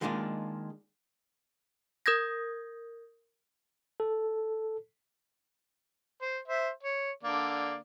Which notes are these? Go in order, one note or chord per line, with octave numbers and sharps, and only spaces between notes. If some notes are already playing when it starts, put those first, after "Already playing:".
D#3 G#3 A#3 D4 F4
A#4 D#6 G6 G#6 A#6
A4
C5
C5 E5
C#5
D3 A#3 D5